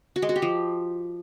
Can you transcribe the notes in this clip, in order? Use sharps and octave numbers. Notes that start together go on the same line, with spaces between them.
F#4
G#3
F#4
G4
F3